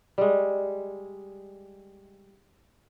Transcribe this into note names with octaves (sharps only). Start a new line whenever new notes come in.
G3 G#3